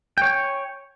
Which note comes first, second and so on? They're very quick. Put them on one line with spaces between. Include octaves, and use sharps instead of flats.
G5 C#5 G#5